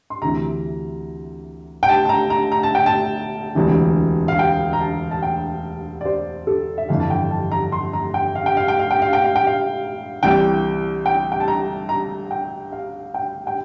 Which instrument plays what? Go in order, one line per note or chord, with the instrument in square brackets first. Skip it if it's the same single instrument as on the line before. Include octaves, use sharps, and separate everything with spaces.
[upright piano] C6
D2 C3 E3 A#5
G5
A5
A5
A#5
A#5
A#5
A5
G5
A5
E1 D2 C3 E3
F5
G5
A#5
A5
A5
G5
D5
C5
A4
E5
G1 F2 E3 F5
A5
G5
A5
A#5
C6
A#5
G5
F5
G5
F5
G5
F5
G5
F5
G5
F5
G5
F5
C2 C3 E3 G5
G5
G5
A5
A#5
A#5
G5
F5
G5
G5